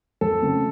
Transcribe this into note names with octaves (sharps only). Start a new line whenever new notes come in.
F2 A4
C#3 F#3 A3 C4